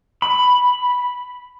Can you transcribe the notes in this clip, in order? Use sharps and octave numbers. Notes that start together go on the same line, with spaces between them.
B5